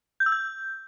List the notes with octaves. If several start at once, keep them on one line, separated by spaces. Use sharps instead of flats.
G6
E6
G6